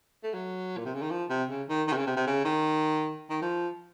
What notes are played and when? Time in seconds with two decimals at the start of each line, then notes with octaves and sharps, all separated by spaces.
0.24 A3
0.34 F#3
0.77 A#2
0.85 C3
0.94 C#3
1.02 D#3
1.11 F3
1.30 C3
1.50 C#3
1.69 D#3
1.88 D#3
1.92 C3
1.97 C#3
2.06 C3
2.17 C3
2.27 C#3
2.45 D#3
3.30 D#3
3.42 F3